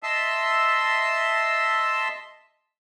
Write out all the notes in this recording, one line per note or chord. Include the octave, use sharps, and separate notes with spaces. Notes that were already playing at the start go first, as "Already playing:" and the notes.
D#5 E5 A5 C6 E6